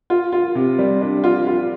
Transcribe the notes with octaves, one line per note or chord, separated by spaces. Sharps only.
F4
F4
C3
G3
D4
F4
F4